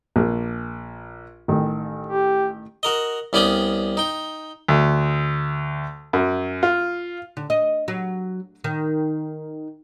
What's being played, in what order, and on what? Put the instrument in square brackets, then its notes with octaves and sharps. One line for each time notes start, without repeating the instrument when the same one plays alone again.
[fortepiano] A#1
A1 D#3
[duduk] G4
[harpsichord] F#4 A#4 D#5
C2 B3 C#4 D5 G5 D#6
D#4 G5
[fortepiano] D2
F#2
F4
[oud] D3
D#5
F#3
D#3